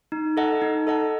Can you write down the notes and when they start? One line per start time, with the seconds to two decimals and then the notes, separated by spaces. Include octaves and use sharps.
0.12 D#4
0.37 A4 D#5 F#5 A5
0.62 D#4
0.87 A4 D#5 F#5 A5